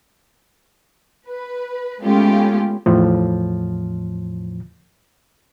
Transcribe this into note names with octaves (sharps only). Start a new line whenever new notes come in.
B4
G#3 A3 B3 C#4 F4 G4
E2 A2 F3